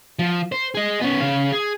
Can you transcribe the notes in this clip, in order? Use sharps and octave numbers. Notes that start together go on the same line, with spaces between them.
F3
C5
G#4 D#5
B3 C#4
C#3 F5
G#4